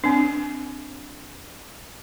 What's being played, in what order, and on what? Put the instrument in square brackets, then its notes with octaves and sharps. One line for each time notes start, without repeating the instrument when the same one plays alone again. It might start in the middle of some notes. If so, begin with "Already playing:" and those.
[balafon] C4 D4